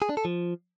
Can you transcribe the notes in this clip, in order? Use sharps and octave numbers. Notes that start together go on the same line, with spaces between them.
G#4
D4
A4
F3